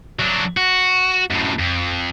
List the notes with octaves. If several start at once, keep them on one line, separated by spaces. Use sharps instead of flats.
F#3 D4
F#4
F#2 A2
F2